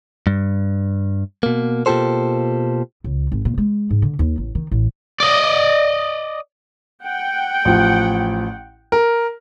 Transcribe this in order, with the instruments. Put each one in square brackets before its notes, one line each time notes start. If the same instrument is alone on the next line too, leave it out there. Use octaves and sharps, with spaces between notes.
[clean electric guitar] G2
B2 A#3
B2 A#3 F4 G4 A4 C5
[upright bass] C#2
G#1
A#2
G#3
G#2
D3
D#2
A1
D#3
A1
[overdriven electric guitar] D5 D#5
[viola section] F#5 G5
[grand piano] A1 F3
A#4